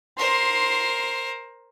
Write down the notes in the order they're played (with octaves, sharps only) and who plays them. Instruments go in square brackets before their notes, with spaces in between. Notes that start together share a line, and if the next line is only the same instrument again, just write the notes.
[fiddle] A#4 C5 [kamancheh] C6